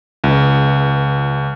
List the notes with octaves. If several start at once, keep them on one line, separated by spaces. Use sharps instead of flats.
C#2